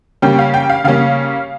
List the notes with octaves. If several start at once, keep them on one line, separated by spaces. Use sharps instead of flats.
C#3 G3 A#3 C#4 G5
F5
G5
F5
C#3 G3 A#3 C#4 F5